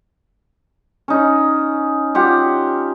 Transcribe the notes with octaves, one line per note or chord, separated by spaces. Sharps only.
C#4 D#4
F4 G4 F#5